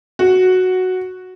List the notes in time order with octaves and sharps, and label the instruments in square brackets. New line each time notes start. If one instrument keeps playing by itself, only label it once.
[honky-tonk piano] F#4